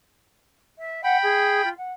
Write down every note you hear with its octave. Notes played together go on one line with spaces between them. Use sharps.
E5
F#5 G5 B5
G#4
F4
F#5